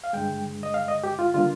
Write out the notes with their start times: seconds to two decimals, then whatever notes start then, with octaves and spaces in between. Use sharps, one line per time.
0.04 F5
0.13 G2 D3 G#3 G5
0.63 D#5
0.74 F5
0.88 D#5
1.04 G4
1.19 F4
1.34 D3 G3 A#3 F4